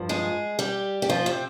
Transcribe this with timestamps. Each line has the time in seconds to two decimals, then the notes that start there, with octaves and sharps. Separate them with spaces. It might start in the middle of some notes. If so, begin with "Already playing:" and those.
Already playing: G2 F3
0.09 G#3 G#4
0.59 G3 G4
1.02 G4
1.10 F3 F4
1.26 C3 C4